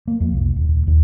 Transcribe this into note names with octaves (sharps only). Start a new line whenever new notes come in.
A#3
F2
C2
D#1
D#2